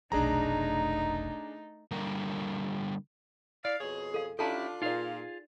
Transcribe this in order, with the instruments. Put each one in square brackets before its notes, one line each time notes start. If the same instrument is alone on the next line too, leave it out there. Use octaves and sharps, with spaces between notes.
[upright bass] F1 B1 [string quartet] A3 D#4 [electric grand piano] D4 G#4 A#5
[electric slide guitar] D3 G3 A#3 A#4
[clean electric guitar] E4 D5 [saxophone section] F5
[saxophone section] F2 B2 G#4 [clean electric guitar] C#5
[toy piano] A4 F5
[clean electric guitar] C#4 E4 G4 [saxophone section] D4 F4 [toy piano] A4 A5 A#5
[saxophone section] A#2 [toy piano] D#4 D5 [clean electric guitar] F4 G#4 F5